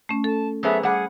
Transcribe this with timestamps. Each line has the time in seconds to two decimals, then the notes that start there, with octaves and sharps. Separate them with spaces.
0.09 A3 C#4
0.24 A4 A5
0.63 F#3 B3 G#4 A4 C5 E5
0.83 G3 G#4 F#5